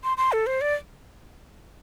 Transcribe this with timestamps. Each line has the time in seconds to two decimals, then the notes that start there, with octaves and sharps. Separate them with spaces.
0.04 C6
0.17 C6
0.32 A4
0.47 C5
0.61 D5